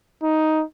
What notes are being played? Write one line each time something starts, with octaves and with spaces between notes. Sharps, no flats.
D#4